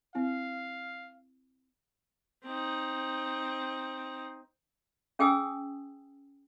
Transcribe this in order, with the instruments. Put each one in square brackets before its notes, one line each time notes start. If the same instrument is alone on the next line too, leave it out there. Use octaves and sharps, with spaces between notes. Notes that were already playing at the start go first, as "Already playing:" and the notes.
[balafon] C4 E4 [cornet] F5
[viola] C4 D#4
[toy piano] C#4 G#4 G5 G#5 D#6 E6